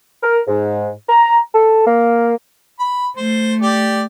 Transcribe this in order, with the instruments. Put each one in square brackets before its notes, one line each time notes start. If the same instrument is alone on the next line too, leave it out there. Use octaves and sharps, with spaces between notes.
[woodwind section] A#4
G#2
A#5
A4
A#3
[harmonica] B5
[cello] A3 [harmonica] C5
[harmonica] G4 D5